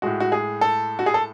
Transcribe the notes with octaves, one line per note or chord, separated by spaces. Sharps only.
A2 G#3 F#4
F#4
G#4
A4
F#4
G#4
A4